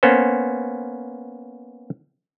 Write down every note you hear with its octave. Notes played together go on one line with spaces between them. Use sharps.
A#3 B3 C#4 C5